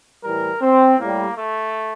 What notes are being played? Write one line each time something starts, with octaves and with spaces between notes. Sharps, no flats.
A2 E3 G3 A#4
C4
A2 G3 A#3
A3